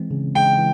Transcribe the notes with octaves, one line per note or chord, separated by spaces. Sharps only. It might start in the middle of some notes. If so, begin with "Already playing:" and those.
Already playing: E3 G#3 C4
C#3
G#3 G5
E3